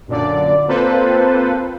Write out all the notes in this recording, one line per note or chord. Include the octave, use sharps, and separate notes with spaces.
F#2 A#2 D3 D5
A#3 C4 F4 A4 B4 C5